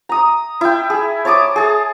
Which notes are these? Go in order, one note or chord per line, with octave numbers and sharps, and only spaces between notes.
A#5 D#6
E4 G5
G#4
C#5 A5 D6 D#6
G#4 A5